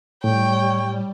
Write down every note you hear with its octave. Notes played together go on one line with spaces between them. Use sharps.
A2 G3 C#5 G5